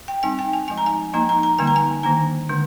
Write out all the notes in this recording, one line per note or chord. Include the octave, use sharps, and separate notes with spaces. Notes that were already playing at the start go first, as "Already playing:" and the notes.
G5
G3 C4 D#4 G#5
G5
G#5
F3 G#3 D#4 G#5
A#5
G#5
F3 A#3 D#4 A#5
A#5
A#5
D3 G3 A#3 D#4 G#5
A#5
G#5
D#3 A#3 D4 A#5
D3 G#3 D4